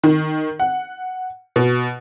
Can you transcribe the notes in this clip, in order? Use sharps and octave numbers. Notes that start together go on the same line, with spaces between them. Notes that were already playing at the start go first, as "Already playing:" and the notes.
D#3
F#5
B2